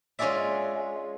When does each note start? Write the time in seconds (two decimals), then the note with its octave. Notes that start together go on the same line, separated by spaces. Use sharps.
0.19 G#3 C#4 F4 G#4 D5 E5